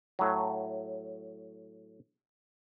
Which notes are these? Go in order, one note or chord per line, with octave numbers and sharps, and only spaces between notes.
A2 F#3